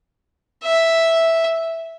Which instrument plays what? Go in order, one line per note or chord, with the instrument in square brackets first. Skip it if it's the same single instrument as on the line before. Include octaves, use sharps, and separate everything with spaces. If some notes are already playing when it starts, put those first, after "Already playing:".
[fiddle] E5